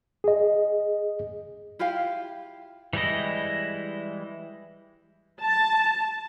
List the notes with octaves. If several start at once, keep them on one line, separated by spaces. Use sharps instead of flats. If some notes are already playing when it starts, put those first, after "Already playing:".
G#4 D#5
E4 F4 G4 F5
E3 G3 G#3 E4 D#5
A5